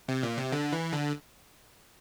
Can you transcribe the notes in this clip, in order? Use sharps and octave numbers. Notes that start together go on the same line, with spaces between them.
C3
A#2
C3
D3
E3
D3